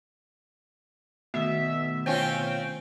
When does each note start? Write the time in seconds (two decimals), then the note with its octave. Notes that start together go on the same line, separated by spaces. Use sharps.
1.34 B2 D#3 A3 B3 E5
2.06 C4 C#4 F4 G5